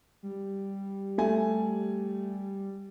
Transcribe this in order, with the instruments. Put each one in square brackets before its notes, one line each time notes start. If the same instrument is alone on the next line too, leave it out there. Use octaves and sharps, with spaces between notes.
[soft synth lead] G3
[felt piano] A3 G#5